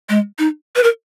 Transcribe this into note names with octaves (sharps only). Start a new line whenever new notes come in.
G#3
D#4
B4
A#4